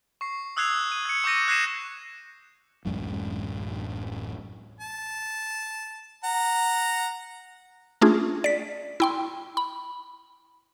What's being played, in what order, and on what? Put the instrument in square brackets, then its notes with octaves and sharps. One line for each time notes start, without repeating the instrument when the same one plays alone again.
[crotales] C#6 C7
D#6 E6 F#6 G#6 C7 F7
D#7
G#6 C#7
C#6 D6 G6 A#6 D#7
F#6 G#6 A#6 C7 D#7 E7
[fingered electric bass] D1 A1 F#2 G#3
[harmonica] A5
F#5 A#5
[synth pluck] A3 C#4 D4 F4 G#4
D5 B6
E4 G5 C6
B5